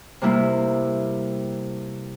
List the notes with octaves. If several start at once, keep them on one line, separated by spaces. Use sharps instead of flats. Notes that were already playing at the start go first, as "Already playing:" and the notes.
C3 G3 A#3 E4